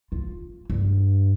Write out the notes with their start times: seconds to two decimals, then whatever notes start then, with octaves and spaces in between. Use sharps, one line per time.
0.12 F4
0.70 G2